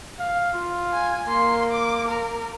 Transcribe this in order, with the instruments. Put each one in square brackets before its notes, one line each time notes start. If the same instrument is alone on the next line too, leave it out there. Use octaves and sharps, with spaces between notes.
[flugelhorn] F5
F4
[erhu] G#5
[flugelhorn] A#3 [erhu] C6
[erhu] D6
A#4